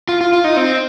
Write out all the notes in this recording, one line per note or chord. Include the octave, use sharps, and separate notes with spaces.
F4
F4
F4
D#4
C4